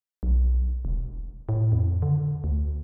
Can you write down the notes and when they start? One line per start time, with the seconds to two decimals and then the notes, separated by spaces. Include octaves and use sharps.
0.23 B1
0.85 E1
1.49 A2
1.72 F2
2.02 D3
2.44 D2